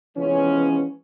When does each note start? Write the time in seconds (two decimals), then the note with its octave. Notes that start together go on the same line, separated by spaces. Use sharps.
0.17 C3 E3 F3 G#3 B3 C#4